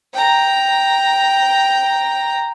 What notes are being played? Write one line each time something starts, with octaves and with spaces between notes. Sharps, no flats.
G5 A#5